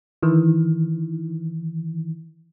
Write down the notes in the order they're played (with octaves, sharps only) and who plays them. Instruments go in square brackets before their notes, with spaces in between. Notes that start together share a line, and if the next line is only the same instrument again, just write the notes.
[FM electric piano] D#3 E3